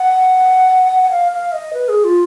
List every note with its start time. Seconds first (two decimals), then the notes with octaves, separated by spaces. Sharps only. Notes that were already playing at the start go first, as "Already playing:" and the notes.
Already playing: F#5
1.11 F5
1.32 F5
1.53 D#5
1.73 B4
1.89 G#4
2.04 F4